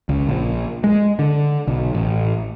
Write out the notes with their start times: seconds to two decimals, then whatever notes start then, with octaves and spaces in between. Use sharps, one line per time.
0.09 C#2
0.29 A#1
0.84 G#3
1.19 D3
1.67 B1
1.94 A1